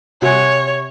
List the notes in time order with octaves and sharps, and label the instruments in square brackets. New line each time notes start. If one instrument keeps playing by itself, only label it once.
[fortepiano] C3 F#5 G#5 [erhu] C#5